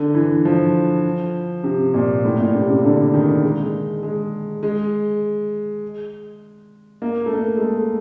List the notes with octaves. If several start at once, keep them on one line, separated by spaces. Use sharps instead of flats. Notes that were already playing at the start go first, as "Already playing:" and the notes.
Already playing: D3
E3
F3
C3
A#2
A2
A#2
C3
C#3
D3
D#3
G#3
G#3
G#3
A#3
A3
A#3
G#3
A3